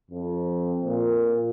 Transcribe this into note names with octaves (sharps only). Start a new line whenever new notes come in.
F2
A#2